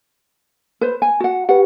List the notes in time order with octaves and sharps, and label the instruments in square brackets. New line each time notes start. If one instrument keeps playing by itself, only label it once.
[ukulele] B4 C5
G#5
F#4 F#5
[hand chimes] G4 B4 [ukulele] F#5